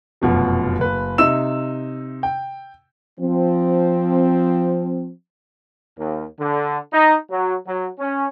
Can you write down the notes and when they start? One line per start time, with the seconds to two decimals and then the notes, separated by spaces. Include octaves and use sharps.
0.22 F1 F#2 B2 F3
0.79 F#1 B4
1.18 C3 D#4 E5 E6 E7
2.23 G5
3.20 F3 C4
5.98 D#2
6.40 D3
6.93 D#4
7.30 F#3
7.67 F#3
7.99 C#4